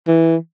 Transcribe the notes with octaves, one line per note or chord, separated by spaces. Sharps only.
E3